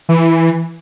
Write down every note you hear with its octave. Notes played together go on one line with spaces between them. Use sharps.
E3